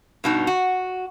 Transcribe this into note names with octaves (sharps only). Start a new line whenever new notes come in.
G2 B2 D#4
F#4